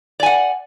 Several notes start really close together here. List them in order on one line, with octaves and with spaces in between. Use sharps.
D5 G#5 F#5